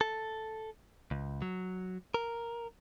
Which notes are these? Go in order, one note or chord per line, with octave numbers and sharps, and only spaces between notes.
A4
C#2
F#3
A#4